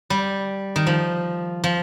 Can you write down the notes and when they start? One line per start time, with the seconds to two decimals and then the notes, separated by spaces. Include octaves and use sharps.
0.10 G3
0.76 D#3
0.87 F3
1.64 F3